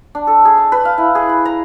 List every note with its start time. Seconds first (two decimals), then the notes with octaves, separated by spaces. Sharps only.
0.15 D4
0.27 A4
0.45 G#4
0.58 A5
0.72 B4
0.85 F5
0.98 E4
1.15 G#4
1.29 B5
1.45 A#5